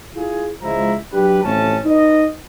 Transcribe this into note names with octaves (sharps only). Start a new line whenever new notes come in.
E4 F4 G#4
C#2 F3 G#3 E4 A#5
F#3 D4 G4 B4
A1 F2 A3 C#4 A5
D#4 B4 D#5